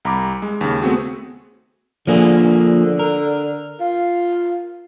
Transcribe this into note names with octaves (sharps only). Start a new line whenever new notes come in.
C2 A#5 B5 D6
G#3
D#2 C#3
A3 B3 C4 F#4 G#4
D3 F3 A#3 G#4
A#4
F4